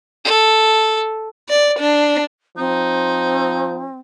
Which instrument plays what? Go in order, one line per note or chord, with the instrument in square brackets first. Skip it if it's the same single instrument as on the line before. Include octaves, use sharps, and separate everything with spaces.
[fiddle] A4
[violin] D5
D4
[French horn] F3 [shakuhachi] C4 [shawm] D#4